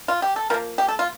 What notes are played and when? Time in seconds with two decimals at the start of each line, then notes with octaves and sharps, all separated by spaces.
0.08 F4
0.22 G4
0.36 A4
0.50 F3 A#3 A#4
0.78 G4
0.88 A4
0.99 F4